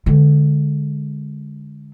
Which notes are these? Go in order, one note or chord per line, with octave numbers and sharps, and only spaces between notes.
D3 G#3